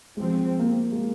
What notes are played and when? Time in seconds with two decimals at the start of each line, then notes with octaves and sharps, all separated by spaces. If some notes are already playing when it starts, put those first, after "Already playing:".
0.17 F3 G#3 C4
0.59 A#3
0.92 G#3